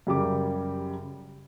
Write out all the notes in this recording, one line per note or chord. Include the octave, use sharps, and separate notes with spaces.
F#2 C#3 G3 G4 A#4 D6